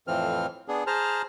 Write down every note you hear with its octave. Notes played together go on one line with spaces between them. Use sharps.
F2 A2 E3 F3 C4 F6
B3 D4 G#4
G#4 C5 A5 A#5 F6